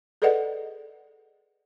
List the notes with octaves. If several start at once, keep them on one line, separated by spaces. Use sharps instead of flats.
G#4 A4 B4 D5 D#5 F#5